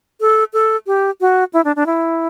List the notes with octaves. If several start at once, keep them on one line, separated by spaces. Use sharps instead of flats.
A4
A4
G4
F#4
E4
D4
D4
E4